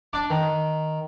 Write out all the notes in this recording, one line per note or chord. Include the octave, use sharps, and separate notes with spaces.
D4 A5 D6
D#3